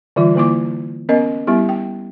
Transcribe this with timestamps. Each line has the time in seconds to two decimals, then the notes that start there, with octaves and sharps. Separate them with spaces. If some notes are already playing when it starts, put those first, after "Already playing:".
0.16 D3 E3 G3 F4
0.36 D3 A#3 E4 D6
1.09 B3 C#4 A#4 D#5
1.47 G3 B3 E4 G4
1.69 G5